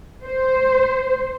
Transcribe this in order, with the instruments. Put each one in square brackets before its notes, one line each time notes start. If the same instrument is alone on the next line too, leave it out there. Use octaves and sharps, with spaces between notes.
[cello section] C5